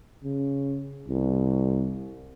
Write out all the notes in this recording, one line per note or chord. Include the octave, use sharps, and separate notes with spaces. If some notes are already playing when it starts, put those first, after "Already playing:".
C#3
C2